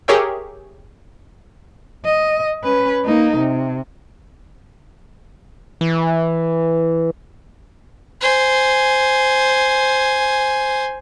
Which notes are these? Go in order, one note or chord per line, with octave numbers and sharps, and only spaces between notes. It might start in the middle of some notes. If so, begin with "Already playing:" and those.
G4 G#4 A#4 C#5 E5 G5
D#5
C#4 B4
A#3 D#4
C3
E3
C5 G#5